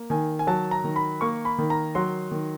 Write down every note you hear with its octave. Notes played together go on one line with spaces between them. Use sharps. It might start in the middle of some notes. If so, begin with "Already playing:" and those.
Already playing: A#3
D#3 G#5
G#5
F#3 A5
A#5
D#3
B5
A#3 C#6
B5
D#3
A#5
F#3 C6
D#3